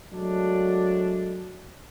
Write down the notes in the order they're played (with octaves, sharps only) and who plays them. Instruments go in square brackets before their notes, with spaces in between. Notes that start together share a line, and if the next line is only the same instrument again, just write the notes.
[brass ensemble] F#3 G#3 A3 D4